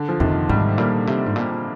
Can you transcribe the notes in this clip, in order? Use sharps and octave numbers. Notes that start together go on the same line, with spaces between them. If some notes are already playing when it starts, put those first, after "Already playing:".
Already playing: D3
F3
F2 C3 D#3
G#2 D#3 G3
A#2 G3 A#3
C3
G#2
A#2